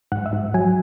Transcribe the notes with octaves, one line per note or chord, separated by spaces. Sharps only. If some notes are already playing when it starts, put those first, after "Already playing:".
G#2 F#5
E5
G#2
F#3 G#5